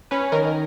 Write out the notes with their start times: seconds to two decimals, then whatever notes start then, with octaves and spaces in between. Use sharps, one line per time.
0.11 C#4 B4
0.32 D#3 A#4